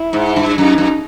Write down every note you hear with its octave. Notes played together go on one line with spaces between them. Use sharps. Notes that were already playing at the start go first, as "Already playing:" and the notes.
Already playing: E4
G#2
G2
F#2 D#4
F#2